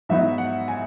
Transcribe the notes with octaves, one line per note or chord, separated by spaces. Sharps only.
G#2 F#3 B3 D#4 E5
F#5
G#5